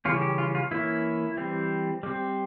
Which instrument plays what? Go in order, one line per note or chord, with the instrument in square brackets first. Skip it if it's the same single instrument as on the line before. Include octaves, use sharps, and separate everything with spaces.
[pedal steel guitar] C#3 E3 G3 C#4 F4
G4
F4
F4
E3 A#3 C#4 E4
E3 G3 C4
G3 C4